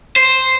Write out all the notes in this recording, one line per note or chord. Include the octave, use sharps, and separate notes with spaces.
C5